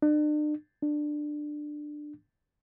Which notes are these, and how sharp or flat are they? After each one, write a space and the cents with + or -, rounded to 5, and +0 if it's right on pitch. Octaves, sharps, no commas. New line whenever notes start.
D4 +40
D4 +15